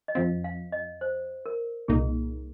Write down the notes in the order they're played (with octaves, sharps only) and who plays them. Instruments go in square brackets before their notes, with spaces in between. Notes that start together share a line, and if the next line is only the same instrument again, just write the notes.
[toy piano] D#5
[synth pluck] F2 F3 C4 [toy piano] F5
[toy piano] F5
D#5
C5
A#4
[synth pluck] C2 A#2 A#3 D#4 [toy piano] G#4